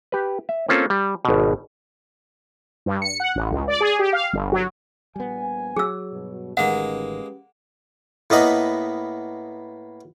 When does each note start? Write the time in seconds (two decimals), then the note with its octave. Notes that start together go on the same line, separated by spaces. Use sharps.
0.12 G4 B4
0.49 E5
0.69 A#3 C4 C#4 F4 A4
0.90 G3
1.25 G#1 B2
2.86 G2
3.02 C#7
3.20 F#5
3.35 A1
3.51 C#2
3.68 D5
3.80 G#4
3.99 G4
4.13 F5
4.33 G1
4.52 F#3
5.16 A#1 G3 B3 G#5
5.76 F#3 G#4 E6
6.11 G2 B2
6.57 A1 D#3 G#3 A#3 C#4 G4 B4 F#5
8.30 A2 A#3 B3 D#5 B5